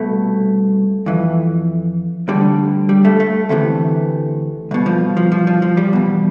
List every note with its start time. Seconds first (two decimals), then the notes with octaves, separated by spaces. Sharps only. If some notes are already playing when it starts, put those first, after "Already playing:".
Already playing: C2 B2 A3
1.06 F2 E3
2.28 D2 D3 G3
2.89 G3
3.05 A3
3.20 A3
3.49 D2 C3 E3 A3
4.71 C2 B2
4.86 F3
5.17 F3
5.32 F3
5.47 F3
5.62 F3
5.77 G3
5.93 E2 B2